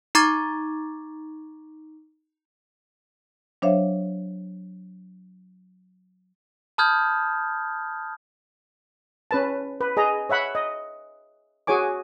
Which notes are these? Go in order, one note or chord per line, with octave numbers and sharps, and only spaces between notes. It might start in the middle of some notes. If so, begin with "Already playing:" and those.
D#4 A#5 C#6 D6 G#6 A6
F#3 D4 C5 C#5 E5 F5
A5 B5 D#6 F6 G6 G#6
C#4 B4 A5
B4
G#4 D#5 A#5
C#5 E5 F#5 B5
D#5
F#4 G#4 C#5 G#5 D6